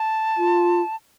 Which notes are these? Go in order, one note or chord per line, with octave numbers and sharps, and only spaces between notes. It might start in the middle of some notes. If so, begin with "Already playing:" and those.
Already playing: A5
F4